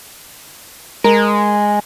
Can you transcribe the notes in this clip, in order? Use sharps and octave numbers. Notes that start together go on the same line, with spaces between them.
G#3 A#4